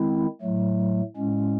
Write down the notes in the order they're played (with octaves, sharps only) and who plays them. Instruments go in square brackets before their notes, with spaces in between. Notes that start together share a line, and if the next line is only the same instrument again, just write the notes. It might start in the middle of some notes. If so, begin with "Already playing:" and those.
Already playing: [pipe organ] D#3 G#3 C4 E4
A2 F#3 A3
A2 G#3 C#4